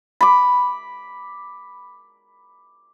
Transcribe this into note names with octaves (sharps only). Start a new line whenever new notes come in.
B5 D6